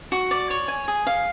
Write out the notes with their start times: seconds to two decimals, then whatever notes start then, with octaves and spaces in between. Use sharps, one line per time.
0.12 F#4
0.31 D5
0.50 C#5
0.68 G#5
0.88 G#4
1.07 F5